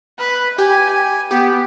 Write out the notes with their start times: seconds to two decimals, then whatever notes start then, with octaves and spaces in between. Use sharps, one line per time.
0.19 B4
0.58 G4 G#5
1.31 B3 G4